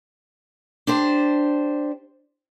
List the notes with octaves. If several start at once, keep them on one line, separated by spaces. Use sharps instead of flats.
D4 G4 C5